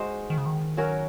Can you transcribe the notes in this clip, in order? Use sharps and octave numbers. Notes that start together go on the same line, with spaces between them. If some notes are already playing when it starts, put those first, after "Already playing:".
Already playing: G#3 D#4 F#4 C5
D#3
C#3
D#3
F#3 C#4 F#4 A#4